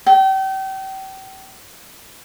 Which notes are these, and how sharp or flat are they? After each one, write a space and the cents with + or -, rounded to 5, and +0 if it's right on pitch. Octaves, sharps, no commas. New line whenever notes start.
G5 -35